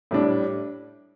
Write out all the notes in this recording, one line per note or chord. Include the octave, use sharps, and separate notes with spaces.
A2 G3 D4